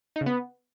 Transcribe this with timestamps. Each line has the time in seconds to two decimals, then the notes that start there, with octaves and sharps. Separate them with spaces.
0.16 D#4
0.21 C#3
0.26 B3